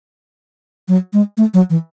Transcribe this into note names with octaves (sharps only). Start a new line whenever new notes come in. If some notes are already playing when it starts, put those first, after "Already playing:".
F#3
G#3
A3
F#3
E3